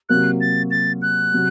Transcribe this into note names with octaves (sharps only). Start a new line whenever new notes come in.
C3 F#3 A#3 F#6
A6
A6
F#6
C3 F#3